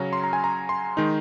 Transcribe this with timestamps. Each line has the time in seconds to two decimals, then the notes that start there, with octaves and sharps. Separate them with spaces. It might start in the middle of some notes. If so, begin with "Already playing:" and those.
Already playing: C#3 F#3 C#4 A#5
0.13 C6
0.24 A#5
0.33 G#5
0.44 A#5
0.69 C6
0.97 D#3 G#3 D#4